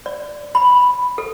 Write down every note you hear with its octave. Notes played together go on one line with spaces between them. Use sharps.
D5
B5
A4